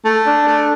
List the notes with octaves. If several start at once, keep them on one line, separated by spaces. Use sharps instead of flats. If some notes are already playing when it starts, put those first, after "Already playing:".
A3
D4
A3